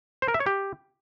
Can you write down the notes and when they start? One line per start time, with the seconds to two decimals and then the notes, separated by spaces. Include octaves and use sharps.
0.22 C5
0.28 A#4
0.34 E5
0.40 C#5
0.46 G4